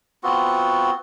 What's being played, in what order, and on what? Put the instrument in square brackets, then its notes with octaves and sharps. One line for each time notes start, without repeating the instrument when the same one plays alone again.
[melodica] B3 C4 F4 F#4